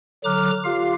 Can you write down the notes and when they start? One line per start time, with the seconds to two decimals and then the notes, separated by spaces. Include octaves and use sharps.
0.24 D3 F#3 A#5 D6 F6 F#6
0.64 F4 G4 F5